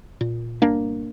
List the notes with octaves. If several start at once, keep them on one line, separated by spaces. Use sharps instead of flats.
A#2
G1 A#3 D4